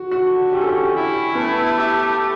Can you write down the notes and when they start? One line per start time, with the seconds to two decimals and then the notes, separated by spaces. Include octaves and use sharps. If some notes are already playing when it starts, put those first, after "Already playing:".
Already playing: F#4
0.11 D3 F#4
0.53 C#4 G4
0.61 A4
0.69 G4
0.95 E4 G4
1.35 A3 B3
1.78 G4
2.19 A3